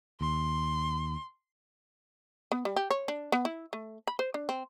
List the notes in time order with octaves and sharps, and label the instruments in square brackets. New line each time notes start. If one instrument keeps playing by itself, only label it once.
[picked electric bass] D#2 [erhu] C6
[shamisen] B3
G3
G4
C#5
D4
B3
E4
A3
B5
C5
D4
C4